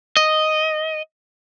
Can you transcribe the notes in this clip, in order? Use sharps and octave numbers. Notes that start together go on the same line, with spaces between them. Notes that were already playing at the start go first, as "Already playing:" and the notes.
D#5